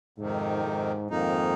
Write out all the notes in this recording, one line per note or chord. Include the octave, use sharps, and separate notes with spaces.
F2 G#2 C3 D#3
G#2
F2 G#2 D#3 A#3 D#4